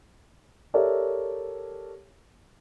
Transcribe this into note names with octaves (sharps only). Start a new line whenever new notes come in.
G4 A4 A#4 C#5 D5 E5